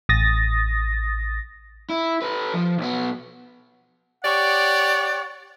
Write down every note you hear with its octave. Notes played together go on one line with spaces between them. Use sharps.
A1 D#6 A6 A#6
E4
A4 B4
F3
B1 B3
G4 C#5 D5 F#5